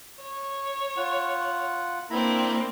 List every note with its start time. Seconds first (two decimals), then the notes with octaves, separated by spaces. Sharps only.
0.21 C#5
0.97 F4 F#5
2.10 A#3 C4 D4 E4 A#5 B5